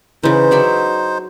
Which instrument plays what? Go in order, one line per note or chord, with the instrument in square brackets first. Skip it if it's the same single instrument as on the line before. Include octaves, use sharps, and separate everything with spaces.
[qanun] C#3 E3 [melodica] D#4 C5
[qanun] F#3 D5 E5